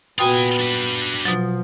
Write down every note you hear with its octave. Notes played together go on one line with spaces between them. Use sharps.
A#2 B3 F4 F#4 G5 G#5 D#6
D4 B4
B2 F3 F#3